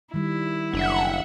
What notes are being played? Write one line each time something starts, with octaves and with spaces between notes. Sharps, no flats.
D#3 G3 E4
F#1 D4 E5 F#5